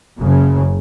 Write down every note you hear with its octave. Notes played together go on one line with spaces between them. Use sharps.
F#1 F#2 C#3